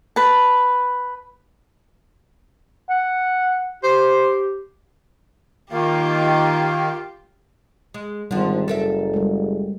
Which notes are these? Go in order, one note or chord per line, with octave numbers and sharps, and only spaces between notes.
B4 A5
F#5
G4 C5
D#3 A#3 F4 G4
G#3
G#1 D3 F3 G3
F#1 A4 A#4 E5
G3 G#3